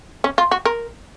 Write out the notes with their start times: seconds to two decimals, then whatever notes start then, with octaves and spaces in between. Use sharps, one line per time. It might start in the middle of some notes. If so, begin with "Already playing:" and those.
0.24 C#4
0.38 F4
0.51 F#4
0.65 A#4